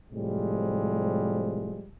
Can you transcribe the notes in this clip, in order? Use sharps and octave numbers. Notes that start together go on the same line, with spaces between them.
A2 C3 F3 G3 G#3